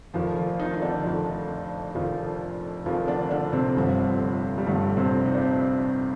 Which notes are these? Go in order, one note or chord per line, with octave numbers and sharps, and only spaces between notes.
F1 F2 D#3 F3 F4
F3 F4
D#3 D#4
D#4
D3 D4
F1 F2 D#3
F1 F2 D#3 F3 F4
F1 F2 D#3 F3 F4
D3 D4
D3 D4
C3 C4
G1 G2 D3 F3
G3
G1 G2 D3 F3 A3
C3 C4
D#4
D4
C4